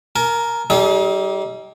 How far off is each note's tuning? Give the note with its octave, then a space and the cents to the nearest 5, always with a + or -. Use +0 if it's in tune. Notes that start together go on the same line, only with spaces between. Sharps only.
A#4 +0 G#5 +45
G3 -20 D#4 +30 G#4 +35